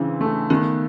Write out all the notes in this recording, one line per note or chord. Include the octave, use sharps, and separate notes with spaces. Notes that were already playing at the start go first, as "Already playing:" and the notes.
Already playing: C#3 E3 C4 D4
A3
D#3 B3